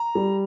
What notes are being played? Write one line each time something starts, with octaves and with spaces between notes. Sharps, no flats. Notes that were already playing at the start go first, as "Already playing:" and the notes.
Already playing: A#5
G3